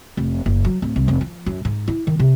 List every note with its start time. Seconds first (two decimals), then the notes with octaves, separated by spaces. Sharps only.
0.17 F1
0.46 F#1
0.65 F#3
0.82 D1
0.96 C2
1.08 F1
1.21 F3
1.46 F#2
1.65 G#2
1.88 E4
2.07 D#3
2.19 C3